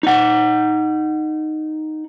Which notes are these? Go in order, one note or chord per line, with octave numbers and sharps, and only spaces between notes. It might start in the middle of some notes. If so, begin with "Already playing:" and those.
D#4 F#5